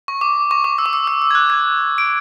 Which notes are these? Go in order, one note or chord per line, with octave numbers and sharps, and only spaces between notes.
C#6
D6
C#6
D6
E6
D6
E6
E6
E6
G#6
F#6
G#6
D7